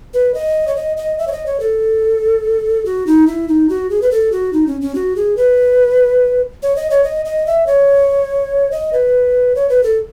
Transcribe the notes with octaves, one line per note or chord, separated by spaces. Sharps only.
B4
D#5
C#5
D#5
D#5
E5
C#5
D#5
C#5
A4
F#4
D#4
E4
D#4
F#4
G#4
B4
A4
F#4
D#4
C#4
C#4
F#4
G#4
B4
C#5
D#5
C#5
D#5
D#5
E5
C#5
D#5
B4
C#5
B4
A4